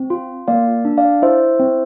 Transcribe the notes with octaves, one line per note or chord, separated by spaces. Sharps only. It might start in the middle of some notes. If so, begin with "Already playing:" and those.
Already playing: C4
F4
A#3 D5 F5
D4
D5 F5
E4 C5 E5
C4